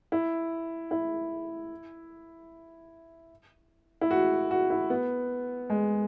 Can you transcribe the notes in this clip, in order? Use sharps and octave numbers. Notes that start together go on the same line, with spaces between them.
E4
E4
E4
F#4
F#4
E4
B3
G#3